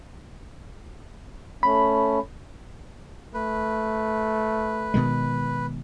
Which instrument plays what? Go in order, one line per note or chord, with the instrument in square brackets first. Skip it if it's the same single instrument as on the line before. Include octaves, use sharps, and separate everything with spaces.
[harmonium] A3 C#4 [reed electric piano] B5
[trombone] A3 [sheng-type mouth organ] B4
[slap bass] B2 D#3 G#3